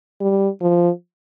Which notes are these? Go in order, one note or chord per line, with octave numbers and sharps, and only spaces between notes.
G3
F3